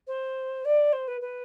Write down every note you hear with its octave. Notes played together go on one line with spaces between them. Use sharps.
C5
D5
C5
B4
B4